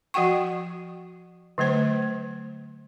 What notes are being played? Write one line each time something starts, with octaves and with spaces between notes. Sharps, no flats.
F3 F#4 F#5 G5 C#6
D3 F#3 A3 C5